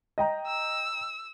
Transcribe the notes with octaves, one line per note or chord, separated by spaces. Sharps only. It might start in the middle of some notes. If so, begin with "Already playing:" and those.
D#5 G5 A#5
E6